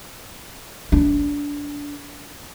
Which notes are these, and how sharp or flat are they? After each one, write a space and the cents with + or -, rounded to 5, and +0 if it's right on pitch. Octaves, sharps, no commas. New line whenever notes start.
D4 -20